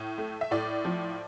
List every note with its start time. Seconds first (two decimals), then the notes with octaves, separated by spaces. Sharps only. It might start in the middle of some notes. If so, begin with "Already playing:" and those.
Already playing: A2
0.18 A3
0.41 E5
0.51 A2 D5
0.85 F3